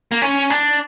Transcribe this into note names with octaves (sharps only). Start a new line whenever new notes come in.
A#3
C#4
D4